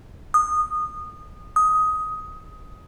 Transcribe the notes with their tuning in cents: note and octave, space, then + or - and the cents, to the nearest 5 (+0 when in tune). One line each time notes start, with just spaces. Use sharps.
D#6 -20
D#6 +15